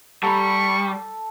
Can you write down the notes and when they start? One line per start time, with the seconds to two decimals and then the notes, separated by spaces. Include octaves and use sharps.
0.23 G3 A4 F#5 A#5 B5 C#6